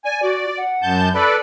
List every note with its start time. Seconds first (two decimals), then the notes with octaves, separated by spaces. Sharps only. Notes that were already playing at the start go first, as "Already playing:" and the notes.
0.05 D5 G#5
0.23 F#4 D5
0.58 F#5
0.82 F#2 A5 G6
1.15 A4 B4 D5 B5